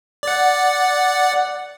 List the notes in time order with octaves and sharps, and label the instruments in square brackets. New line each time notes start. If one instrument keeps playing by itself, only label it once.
[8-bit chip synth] D5 F#5